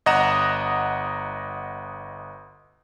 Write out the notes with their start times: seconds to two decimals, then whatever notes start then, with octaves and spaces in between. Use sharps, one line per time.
0.06 G1 D#5 F#5 A#5 E7